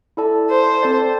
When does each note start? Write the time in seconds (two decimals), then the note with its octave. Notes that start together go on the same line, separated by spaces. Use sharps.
0.17 E4 A4 D5 A5
0.50 C5
0.82 C4 A4 D5 A5